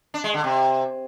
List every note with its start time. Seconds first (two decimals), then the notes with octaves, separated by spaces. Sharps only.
0.14 D4
0.24 G#3
0.34 D3
0.44 C3